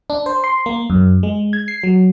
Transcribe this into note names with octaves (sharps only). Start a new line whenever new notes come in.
D4
C5
C6
A#3
F#2
G#3
G#6
C7
F#3